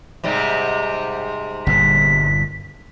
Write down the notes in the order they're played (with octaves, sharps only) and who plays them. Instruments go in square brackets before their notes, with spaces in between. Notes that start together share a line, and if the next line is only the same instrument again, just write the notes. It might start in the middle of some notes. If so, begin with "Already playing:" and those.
[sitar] G#2 C3 G3
[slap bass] G1 G2 A#2 [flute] B6